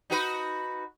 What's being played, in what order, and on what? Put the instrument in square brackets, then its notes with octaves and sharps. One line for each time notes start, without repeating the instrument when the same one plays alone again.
[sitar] D#4 F#4 B4